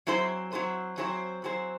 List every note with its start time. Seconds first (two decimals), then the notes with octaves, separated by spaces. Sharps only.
0.07 F#3 C4 E4 G#4 C5
0.53 F#3 C4 E4 G#4 C5
0.97 F#3 C4 E4 G#4 C5
1.44 F#3 C4 E4 G#4 C5